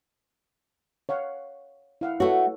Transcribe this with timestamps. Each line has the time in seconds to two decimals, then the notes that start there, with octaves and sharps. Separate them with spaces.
1.09 C#5 F5 F#5
2.01 E4 F5 F#5
2.20 A3 F#4 A4 B4 C#5